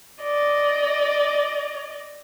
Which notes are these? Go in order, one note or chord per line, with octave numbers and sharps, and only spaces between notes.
D5 D#5